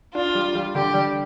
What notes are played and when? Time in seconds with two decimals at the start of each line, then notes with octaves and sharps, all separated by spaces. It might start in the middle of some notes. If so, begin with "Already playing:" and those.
0.14 D4 F4
0.35 G3
0.55 G3
0.75 D3 G4
0.94 G3